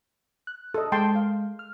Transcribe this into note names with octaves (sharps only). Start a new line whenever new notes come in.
F#6
A4 D#5
G#3 G5 A5 C6
F5
F6